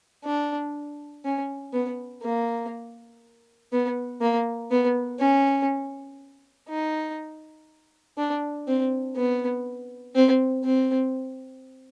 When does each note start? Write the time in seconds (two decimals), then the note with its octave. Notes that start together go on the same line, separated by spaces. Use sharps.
0.25 D4
1.25 C#4
1.73 B3
2.22 A#3
3.72 B3
4.21 A#3
4.71 B3
5.19 C#4
6.69 D#4
8.17 D4
8.67 C4
9.16 B3
10.15 C4
10.64 C4